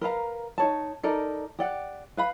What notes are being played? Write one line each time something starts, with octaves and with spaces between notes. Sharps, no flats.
A#4 B4 F5 A#5
D#4 C#5 A5
D#4 A4 A#4 D5
G4 D5 F#5
B4 F5 B5